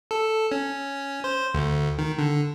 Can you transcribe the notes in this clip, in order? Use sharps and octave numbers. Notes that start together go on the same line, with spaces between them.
A4
C#4
C5
D2
D#3
D3